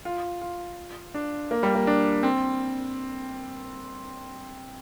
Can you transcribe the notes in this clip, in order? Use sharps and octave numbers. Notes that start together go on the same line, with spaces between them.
F4
F4
D4
A#3
G3
A#3
D4
C4